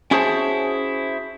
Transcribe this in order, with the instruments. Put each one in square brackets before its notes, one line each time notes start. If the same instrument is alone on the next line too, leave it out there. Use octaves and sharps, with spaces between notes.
[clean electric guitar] C#4 E4 F#4 G#4 C5 A5